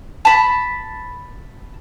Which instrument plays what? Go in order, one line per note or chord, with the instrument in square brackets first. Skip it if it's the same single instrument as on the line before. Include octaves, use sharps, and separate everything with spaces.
[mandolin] A5 B5